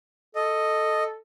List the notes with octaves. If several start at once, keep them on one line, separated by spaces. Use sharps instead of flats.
A4 D#5